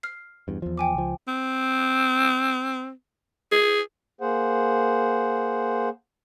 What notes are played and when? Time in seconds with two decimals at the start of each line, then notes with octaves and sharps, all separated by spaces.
0.03 F6 C7
0.48 E2 G2
0.62 E2 F3
0.78 G5 G#5 D6
0.94 C#2 F3
1.28 C4
3.52 G#4
4.21 A#3 G#4 C5 F#5